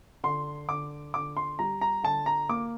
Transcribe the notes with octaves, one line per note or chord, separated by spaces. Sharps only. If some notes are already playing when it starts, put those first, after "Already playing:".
D3 C6
D3 D6
D3 D6
C6
G3 A#5
A#5
D3 A5
A#5
A#3 D6